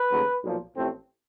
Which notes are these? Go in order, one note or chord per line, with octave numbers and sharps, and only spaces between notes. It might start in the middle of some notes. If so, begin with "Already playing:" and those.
Already playing: B4
D#2 C#3 F#3 A3
B1 A#2 F3
A1 A2 F3 A3 C4